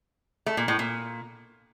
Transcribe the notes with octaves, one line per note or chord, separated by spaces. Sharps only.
A3
A#2
A2
A#2